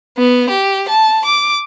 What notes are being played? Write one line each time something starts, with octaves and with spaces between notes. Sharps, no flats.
B3
G4
A5
D6